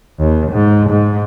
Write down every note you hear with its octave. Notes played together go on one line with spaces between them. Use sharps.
D#2
G#2
G#2